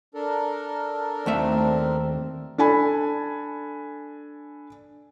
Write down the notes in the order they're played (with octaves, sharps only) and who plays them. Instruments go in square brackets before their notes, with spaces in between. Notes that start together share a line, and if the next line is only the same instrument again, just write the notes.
[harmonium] D4 A4 A#4
[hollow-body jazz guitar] D#2 A3 E5 [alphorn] C4
[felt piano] D4 A4 G#5 B5